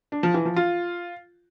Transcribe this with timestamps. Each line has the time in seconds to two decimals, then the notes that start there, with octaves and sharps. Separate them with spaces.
0.12 D4
0.23 F3
0.34 E3
0.45 F3
0.56 F4